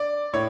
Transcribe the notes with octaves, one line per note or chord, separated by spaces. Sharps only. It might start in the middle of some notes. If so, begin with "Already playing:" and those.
Already playing: D5
A2 C#5